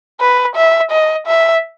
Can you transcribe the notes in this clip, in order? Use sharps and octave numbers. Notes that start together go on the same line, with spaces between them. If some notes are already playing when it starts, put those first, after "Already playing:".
B4
E5
D#5
E5